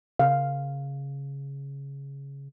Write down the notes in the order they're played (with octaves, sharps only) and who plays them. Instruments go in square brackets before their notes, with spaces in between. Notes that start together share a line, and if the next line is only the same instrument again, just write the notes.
[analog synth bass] C#3 [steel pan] F5